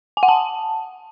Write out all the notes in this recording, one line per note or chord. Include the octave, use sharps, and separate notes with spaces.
G#5
F#5
A5